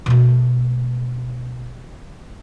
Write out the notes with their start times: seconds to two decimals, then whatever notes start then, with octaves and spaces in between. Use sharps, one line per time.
0.06 B2 A3